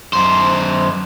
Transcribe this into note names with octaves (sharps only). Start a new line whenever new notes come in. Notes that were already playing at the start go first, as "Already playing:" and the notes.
F#2 C5